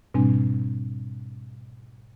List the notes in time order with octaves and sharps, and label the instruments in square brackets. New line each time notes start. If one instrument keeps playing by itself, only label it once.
[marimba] G#2 B2 G3 C4 D4 G#5